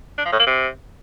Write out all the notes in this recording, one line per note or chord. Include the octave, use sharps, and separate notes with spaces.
D4
F3
A2
A#3
C3